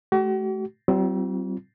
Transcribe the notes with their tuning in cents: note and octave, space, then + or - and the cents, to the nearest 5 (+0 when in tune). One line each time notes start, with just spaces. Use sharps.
A3 -35 F#4 +45
G3 -45 C4 -10 F4 -25